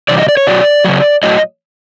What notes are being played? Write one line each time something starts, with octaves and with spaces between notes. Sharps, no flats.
C3 E3 G3 D5
D#5
D5
C#5
B2 F#3 D5
C#3 F#3
A2 F#3 D#5